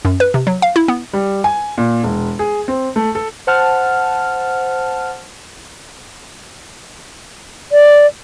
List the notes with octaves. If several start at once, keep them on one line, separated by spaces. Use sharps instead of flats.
F#2
B4
C3
F#3
F5
E4
B3
G3
G#5
A#2
E1
G#4
C4
A3
A4
C5 F#5 A5 F6
D5